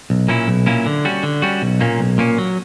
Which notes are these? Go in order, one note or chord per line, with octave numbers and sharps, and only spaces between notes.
B1
A#2 A#3 C#4 E4
B1
A#2 A#3 C#4 E4
D3
G3 C#4 F#4
D3
G3 C#4 F#4
B1
A#2 A#3 C#4
B1
A#2 A#3 C#4
F#3